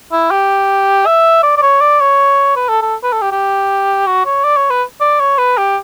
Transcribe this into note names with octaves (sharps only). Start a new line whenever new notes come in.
E4
G4
E5
D5
D5
C#5
D5
C#5
B4
A4
A4
B4
A4
G4
G4
F#4
C#5
D5
C#5
B4
D5
C#5
B4
G4